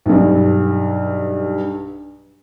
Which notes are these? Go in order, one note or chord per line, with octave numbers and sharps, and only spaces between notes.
B1 G2